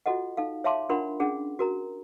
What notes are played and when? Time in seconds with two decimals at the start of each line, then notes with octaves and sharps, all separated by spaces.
0.06 F4 F#4 A4 D#5 F#5
0.37 D#4 A4 F5
0.64 C#5 E5 F5 A5 C6 D6
0.89 D4 F4 A#4 F#5 B5 C6
1.20 C#4 D4 G#4 F#5
1.59 F#4 A#4 A#5